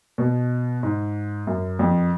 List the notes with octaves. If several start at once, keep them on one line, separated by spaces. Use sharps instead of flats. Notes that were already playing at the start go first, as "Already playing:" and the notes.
B2
G#2
F#2
F2